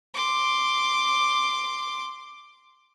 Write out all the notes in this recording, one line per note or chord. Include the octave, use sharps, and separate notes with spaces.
C6 D6